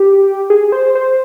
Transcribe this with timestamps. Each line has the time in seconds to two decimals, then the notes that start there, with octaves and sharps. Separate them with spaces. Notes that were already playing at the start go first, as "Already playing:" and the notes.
Already playing: G4
0.50 G#4
0.72 C5
0.95 C5